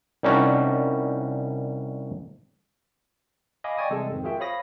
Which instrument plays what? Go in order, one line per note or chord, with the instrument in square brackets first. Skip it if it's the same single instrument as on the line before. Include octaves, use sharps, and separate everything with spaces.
[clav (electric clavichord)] C2 G3 C#4 D#4 F#4 A5
[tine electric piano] D#5 F5 G#5 B5 D6
D5 D#5 G5 G#5 C#6 D#6
C3 E3 G3 G#3 G#4 A4
F2 G#2 D#3 C4
F4 F#4 G#4 A#4 E5 G5
C5 C#5 F5 B5 D#6 A#6